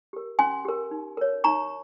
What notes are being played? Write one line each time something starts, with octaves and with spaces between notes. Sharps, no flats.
G4 A#4
C#4 G#5 C6
G4 A#4
D#4
A#4 C#5
D#4 A#5 C#6